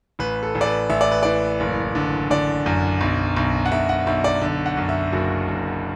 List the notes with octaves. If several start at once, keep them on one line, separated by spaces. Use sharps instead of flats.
A1 B4
A4
A1
D5
B4
A1 E5
D5
B4
E3 D5
F#1
D3
D3 D5
F#2
B1
B1
F#5
B1 E5
F#5
B1 E5
D5
D3
F#5
F#2
E5
F#1 F#4
F#1